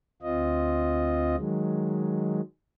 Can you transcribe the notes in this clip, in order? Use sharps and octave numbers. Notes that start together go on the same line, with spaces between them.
D2 C4 F4 D#5
D#3 F#3 G#3